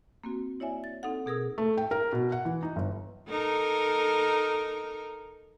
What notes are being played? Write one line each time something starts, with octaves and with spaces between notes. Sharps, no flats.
A#3 C4 F#4
E4 C#5 D5 E5 G#5
A6
C4 D#4 A4 F#5
B2 G#4 A#4 D#6 E6
A3
G5
A#4
B2
F#5
E3
D#4
G1
D#4 A4 A#4